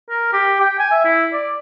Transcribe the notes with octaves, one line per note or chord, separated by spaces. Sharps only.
A#4
G4
G5
G#5
E5
E4
D5